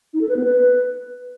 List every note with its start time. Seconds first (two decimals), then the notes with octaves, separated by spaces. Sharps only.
0.14 D#4
0.21 A4
0.29 B4
0.37 B3
0.44 B4